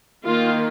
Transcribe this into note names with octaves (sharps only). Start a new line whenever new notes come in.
D#3 A#3 F4